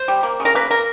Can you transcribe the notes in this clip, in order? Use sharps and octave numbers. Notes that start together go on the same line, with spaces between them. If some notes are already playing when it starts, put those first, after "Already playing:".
Already playing: C5
G3
A#3
C#3
A#4
A#3 B4
A#3 A#4